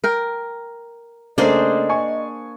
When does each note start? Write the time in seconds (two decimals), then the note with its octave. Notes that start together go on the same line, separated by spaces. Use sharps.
0.04 A#4 G5
1.38 C#3 A3 A#3 D4 G#4 C5 D#5
1.89 G#5 C#6